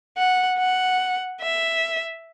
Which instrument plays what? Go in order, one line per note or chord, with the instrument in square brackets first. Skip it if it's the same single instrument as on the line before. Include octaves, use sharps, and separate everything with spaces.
[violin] F#5
F#5
E5